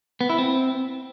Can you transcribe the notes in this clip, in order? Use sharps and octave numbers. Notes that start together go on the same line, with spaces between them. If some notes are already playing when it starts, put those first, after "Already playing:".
B3
E4
C4